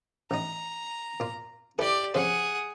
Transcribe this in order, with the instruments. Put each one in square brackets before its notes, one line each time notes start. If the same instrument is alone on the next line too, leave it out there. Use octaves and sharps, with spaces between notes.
[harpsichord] A1 D#4 [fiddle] A#5
[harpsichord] A#2 F4
[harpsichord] E4 A4 B4 [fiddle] G4 D5
[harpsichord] F2 C#3 C5 [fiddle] G#4 F#5